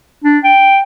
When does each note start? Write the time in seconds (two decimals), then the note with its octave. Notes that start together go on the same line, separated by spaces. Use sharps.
0.24 D4
0.44 G5